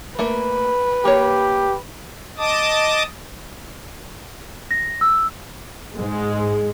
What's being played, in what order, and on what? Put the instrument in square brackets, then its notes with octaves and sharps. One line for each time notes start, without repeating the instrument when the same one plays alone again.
[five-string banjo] A3 A#3 [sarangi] B4
[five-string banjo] A#3 C#5 [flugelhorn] G4
[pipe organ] D#5 A5 D6 D#6
[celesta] A#6
E6
[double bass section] G#2 [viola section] G#3